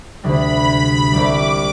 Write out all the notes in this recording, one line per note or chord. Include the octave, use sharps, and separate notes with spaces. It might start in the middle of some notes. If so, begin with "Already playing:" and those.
D2 C3 G3 B5
C2 C3 G3 D6